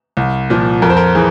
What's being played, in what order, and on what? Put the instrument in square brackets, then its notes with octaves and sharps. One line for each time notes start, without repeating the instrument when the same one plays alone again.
[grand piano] C2
A#2 F3
F2 A#4
C5
A#4
E3 G#4